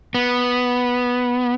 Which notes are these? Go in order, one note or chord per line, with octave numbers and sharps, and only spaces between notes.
B3